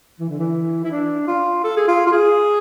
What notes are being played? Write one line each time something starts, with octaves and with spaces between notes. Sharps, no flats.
E3
D3
E3
E4
D4
F4
A4
G#4
F4
F4
G#4